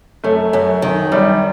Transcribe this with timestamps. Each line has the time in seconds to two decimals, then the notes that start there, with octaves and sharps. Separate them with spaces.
0.24 F#2 A3
0.53 F#2
0.82 D#3
1.12 F#2 G3